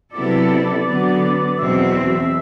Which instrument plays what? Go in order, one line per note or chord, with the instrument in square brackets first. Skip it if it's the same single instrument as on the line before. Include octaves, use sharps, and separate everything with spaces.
[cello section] C3 F#3 B3 E4 A4 [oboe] D5
[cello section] D3 F#3 B3
[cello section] E2 B2 F#3 C4 [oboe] E5